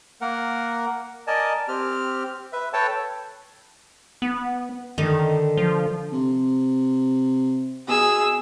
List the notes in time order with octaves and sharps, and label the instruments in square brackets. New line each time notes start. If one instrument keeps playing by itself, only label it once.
[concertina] A#3 A#4 F#5
A#4 D5 D#5 G#5 A5
C4 G4 F6
B4 E5
A4 B4 C#5 G5 A5
[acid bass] B3
[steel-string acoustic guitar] D3 [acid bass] D#3
[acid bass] F3
[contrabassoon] C3
[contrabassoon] B2 [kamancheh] G#4 E6